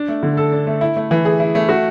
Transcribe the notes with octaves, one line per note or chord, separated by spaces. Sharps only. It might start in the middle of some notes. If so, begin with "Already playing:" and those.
Already playing: D4
A3
D3
A4
D4
A3
E4
A3
E3
G#4
E4
A3
F#4